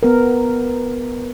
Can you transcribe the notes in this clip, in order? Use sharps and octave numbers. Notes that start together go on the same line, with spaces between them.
B3 A#4